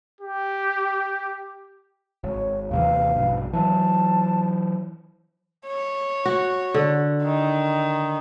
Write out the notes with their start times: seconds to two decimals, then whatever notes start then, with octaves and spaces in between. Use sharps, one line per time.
0.21 G4
2.24 G#1 C#5
2.71 D#2 C3 E3 F5
3.16 A#1 G2 B2
3.53 E3 F#3 A5
5.67 C#5
6.26 F#4
6.74 D3
7.24 D#3